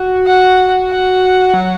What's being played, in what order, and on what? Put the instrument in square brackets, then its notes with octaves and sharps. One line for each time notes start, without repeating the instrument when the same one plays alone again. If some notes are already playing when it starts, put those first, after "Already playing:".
Already playing: [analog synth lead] F#4
[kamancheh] F#5
F#5
[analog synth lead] F#3